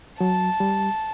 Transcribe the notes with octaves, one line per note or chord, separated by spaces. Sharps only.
F#3 A5
G3